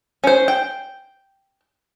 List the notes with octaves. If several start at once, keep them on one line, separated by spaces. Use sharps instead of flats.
C#4 C5
G5